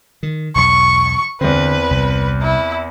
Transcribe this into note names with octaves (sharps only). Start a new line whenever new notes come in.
D#3
B1 E2 C#6
E2 D3 C4 B4
C2
E4